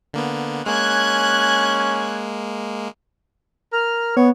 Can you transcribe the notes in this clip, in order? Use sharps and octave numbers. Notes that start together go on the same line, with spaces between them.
D3 A#3 B3
G#3 A#3 C#4 F#6 G#6
A#4 F6
B3 C#5